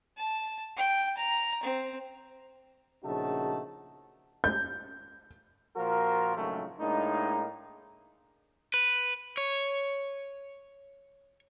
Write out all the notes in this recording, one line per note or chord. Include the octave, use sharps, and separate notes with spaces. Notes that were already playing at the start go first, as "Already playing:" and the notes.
A5
G5
A#5
C4
A#1 C#3 A3 D#4 F#4 A5
G6
A#2 F3 F4 F#4 A#4
A#1 G#2 C#3 F#3 G#3 A3
A2 G#3 A#3 D4 D#4
B4
C#5